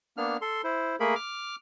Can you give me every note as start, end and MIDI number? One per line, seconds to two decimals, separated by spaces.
0.17 0.37 58
0.17 0.37 59
0.17 0.37 62
0.17 0.37 89
0.41 0.62 69
0.41 0.62 84
0.64 0.96 64
0.64 0.96 72
1.00 1.15 57
1.00 1.15 58
1.00 1.15 68
1.00 1.15 70
1.00 1.15 83
1.16 1.56 86
1.16 1.56 89